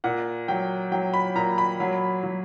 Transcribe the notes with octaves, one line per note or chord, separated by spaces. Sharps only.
A#2 F#5
F#3 G5
F#3 G5
B5
A#2 A#5
B5
F#3
F#3